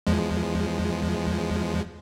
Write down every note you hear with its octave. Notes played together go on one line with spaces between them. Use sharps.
E2 F3 G#3